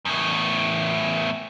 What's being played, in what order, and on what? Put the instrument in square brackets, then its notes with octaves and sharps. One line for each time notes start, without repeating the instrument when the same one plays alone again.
[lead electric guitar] E2 A2